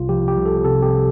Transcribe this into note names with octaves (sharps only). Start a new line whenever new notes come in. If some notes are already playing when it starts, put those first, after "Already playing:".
Already playing: C2 C3 F4
F3 G4
G4
C2
A4
C3 A4
G4